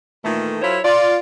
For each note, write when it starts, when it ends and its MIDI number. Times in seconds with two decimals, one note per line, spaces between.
0.24 0.58 46
0.24 0.58 51
0.24 0.58 52
0.24 0.58 57
0.62 0.79 54
0.62 0.79 64
0.62 0.79 65
0.62 0.79 70
0.62 0.79 72
0.62 0.79 73
0.85 1.18 65
0.85 1.18 74